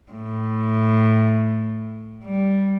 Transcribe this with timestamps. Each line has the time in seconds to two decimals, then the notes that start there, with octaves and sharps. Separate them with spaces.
0.11 A2
2.23 G3